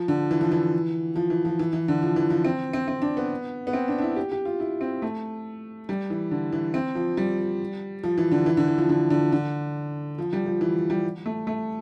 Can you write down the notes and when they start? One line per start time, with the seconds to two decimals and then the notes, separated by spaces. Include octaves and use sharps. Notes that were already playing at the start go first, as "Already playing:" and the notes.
Already playing: F3
0.08 D3
0.31 E3
0.41 F3
0.52 E3
1.16 F3
1.30 E3
1.45 F3
1.59 E3
1.73 E3
1.88 D3
2.02 F3
2.16 E3
2.30 F3
2.45 C4
2.73 C4
2.88 C4
3.02 D4
3.17 B3
3.67 B3
3.73 C4
3.88 D4
3.98 D4
4.02 E4
4.16 G4
4.32 G4
4.45 F4
4.60 E4
4.81 C4
5.02 A3
5.89 G3
6.10 E3
6.31 D3
6.52 E3
6.74 C4
6.95 F3
7.17 G3
8.03 F3
8.18 E3
8.32 D3
8.46 E3
8.57 D3
8.68 E3
8.78 F3
8.89 D3
9.10 D3
9.32 D3
10.18 F3
10.33 G3
10.46 F3
10.61 E3
10.90 G3
11.26 A3
11.47 A3